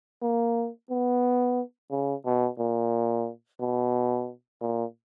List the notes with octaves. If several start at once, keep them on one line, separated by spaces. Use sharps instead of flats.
A#3
B3
C#3
B2
A#2
B2
A#2